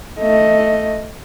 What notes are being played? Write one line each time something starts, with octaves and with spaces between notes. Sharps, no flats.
A3 D#5